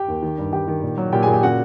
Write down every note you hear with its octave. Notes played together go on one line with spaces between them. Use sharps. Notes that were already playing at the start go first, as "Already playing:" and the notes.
Already playing: G4 G5
D#2
D#3
G2
D#3 G4 G5
D#3
A#2
F#3
A#2 G4 G5
A#2 G#4 G#5
G4 G5
C#3 F#4 F#5